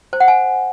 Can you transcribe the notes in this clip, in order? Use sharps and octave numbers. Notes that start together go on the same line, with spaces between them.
C5
F#5
G#5